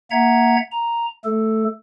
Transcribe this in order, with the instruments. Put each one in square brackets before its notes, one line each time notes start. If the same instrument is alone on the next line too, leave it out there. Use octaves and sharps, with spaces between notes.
[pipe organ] A#3 E5 F#5 A#5 G#6
A#5
A3 A4